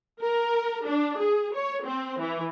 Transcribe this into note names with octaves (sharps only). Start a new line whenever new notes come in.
A#4
D4
G#4
C#5
C4
E3